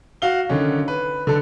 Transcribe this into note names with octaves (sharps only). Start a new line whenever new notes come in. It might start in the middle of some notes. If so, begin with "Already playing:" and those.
F#4 F5 G7
D3 D#3 C#4
B4
D3 A4